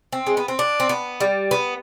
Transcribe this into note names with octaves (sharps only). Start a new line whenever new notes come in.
C4
G#3
B3
C4
D4
C4
B3
G3
B3